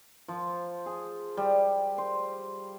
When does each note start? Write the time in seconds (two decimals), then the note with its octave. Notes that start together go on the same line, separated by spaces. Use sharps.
0.28 F3
0.86 G#4
1.37 G3
1.98 C5